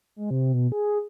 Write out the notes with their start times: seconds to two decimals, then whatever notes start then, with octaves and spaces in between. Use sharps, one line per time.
0.16 G#3
0.31 C3
0.54 B2
0.72 G#4